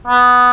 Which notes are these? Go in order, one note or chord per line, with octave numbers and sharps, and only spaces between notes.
B3